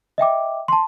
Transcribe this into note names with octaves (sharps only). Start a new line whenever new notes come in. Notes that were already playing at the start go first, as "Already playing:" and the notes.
D#5 E5 G5 D6
A5 C6